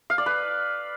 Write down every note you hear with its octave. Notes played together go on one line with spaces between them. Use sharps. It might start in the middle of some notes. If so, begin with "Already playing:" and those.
F5
D5
B4